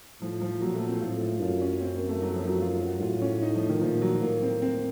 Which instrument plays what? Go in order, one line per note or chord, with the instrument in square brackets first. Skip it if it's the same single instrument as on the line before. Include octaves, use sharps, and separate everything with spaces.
[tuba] A2 [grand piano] F3
[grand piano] F3
[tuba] A#2 [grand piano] F#3
[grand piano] A3
C4
[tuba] A2 [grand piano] F4
[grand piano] F4
[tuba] F#2 [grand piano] F4
[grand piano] C#4
C4
A#3
A3
F#3
F3
F#3
F4
F#4
[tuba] A2 [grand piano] F4
[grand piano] C#4
D#4
F3
D#3
[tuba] A#2 [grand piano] F3
[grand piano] F#3
[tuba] A2 [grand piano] A#3
[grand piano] C4
C4